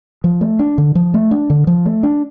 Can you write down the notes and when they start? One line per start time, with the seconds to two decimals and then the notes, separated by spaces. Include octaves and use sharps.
0.24 F3
0.41 A3
0.59 D4
0.78 D3
0.95 F3
1.14 A3
1.31 D4
1.50 D3
1.67 F3
1.86 A3
2.03 D4